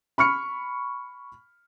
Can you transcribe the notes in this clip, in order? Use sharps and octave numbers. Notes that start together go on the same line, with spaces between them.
B5 C#6 F6 C#7